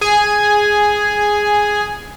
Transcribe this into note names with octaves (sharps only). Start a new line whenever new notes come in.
G#4 G#5